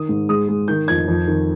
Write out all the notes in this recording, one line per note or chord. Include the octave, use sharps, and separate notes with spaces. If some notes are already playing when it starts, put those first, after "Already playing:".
Already playing: D#3 D#6
G#2
G#3 D#6
G#3
D#3 G6
F2 G#6
F2
D#3